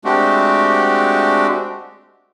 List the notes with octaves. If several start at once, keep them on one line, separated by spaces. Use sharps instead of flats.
G#3 A3 C4 D4 F#4 G4